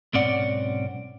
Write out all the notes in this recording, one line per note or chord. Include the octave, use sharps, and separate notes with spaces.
B1 G#2 C4 C#4 D5 F#5